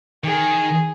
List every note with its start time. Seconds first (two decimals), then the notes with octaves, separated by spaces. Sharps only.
0.24 D#3 G#4